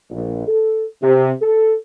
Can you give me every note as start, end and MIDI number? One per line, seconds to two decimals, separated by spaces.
0.11 0.45 34
0.47 0.83 69
1.02 1.30 48
1.41 1.74 69